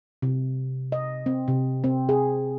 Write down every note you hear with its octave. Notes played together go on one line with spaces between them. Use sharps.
C3
D#5
C4
C3
C4
G#4